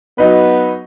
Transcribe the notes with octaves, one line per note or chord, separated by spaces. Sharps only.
F#3 B3 D#4 B4